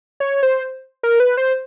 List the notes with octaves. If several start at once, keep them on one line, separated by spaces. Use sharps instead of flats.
C#5
C5
A#4
B4
C5